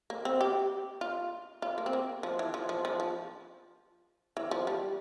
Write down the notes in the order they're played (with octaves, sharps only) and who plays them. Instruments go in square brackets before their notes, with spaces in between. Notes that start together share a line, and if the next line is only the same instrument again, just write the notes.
[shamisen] A#3
C4
G4
F4
F4
A#3
C4
A#3
F3
E3
F3
F3
F3
F3
E3
F3
G3